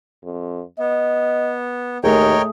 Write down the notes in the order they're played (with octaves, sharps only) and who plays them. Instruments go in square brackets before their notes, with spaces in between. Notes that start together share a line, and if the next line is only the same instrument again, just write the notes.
[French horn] F2
[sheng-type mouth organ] B3 [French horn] D#5
[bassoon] D#2 [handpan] A3 G#4 [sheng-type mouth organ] A#4 C#5 G5 [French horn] D#5